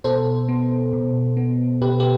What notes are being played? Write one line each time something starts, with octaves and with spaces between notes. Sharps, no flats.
B2 A4 C5
B3
B2
B3
B2 G4 B4
G4